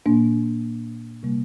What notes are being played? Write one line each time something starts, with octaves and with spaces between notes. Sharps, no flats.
A#2 A#3 D4
C3 G3 A#3